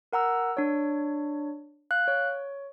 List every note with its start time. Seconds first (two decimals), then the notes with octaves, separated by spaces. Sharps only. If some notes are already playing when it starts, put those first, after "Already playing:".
0.13 A#4 F#5 A#5 E6
0.57 D4 C#5
1.91 F5 F#6
2.08 C#5